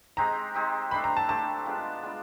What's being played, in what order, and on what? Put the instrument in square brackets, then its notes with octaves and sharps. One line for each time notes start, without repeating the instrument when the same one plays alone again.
[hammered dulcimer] G#3 C4 D#4 G4 [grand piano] A#5
[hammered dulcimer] G#3 C4 D#4 G4
[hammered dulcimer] A3 D4 G4 C5 [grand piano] B5
[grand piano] A#5
A5
[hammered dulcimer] A3 D4 G4 C5 [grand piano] A5
[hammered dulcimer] G#3 B3 D4 F4
G#3 B3 D4 F4